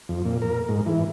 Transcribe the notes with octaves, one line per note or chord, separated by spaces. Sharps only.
F2
A#2
A#4
G#2
E3